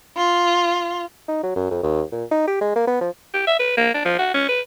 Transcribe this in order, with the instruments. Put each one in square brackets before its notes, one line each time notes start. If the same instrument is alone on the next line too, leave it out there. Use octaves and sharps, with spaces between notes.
[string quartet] F4
[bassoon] D#4
F#3
F#2
F2
D#2
A#2
D#4
G4
G#3
A#3
B3
F3
[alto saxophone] G4
E5
B4
A#3
D4
F3
F#4
C#4
B4